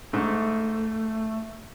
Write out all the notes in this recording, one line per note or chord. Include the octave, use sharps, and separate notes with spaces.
G#2 A3